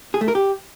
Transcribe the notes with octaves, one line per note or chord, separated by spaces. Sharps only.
G#4
A3
A#4
G4